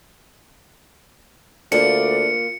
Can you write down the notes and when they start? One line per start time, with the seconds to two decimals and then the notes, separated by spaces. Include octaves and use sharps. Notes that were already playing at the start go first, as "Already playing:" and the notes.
1.72 D2 A#3 D4 F4 D5 C#7